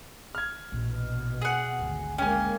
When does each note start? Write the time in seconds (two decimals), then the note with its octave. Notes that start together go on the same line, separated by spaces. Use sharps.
0.35 F6 G#6
0.72 A#1 B2 E3
1.42 G#4 F#5
1.79 G#1 D2
2.18 G#3 A#3 C#4 G5 G#5